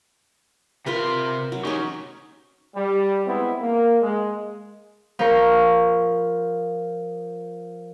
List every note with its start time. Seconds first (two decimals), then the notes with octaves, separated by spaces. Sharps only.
0.86 C3 F4 A#4 B4 C6
1.52 F#3
1.65 C#4 D#4 G4 C#5
2.75 G3
3.26 G#3 B3 C4 E4
3.61 A#3
4.02 G#3
5.19 F3 F4 A#4 C#6